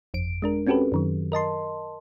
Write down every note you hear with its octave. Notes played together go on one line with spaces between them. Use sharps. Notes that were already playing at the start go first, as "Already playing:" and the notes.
G1 F2 D7
G#3 D4 A#4
C4 C#4 F#4 G4 A4 B4
F#2 D#3 F#3
A#4 D#5 A5 C6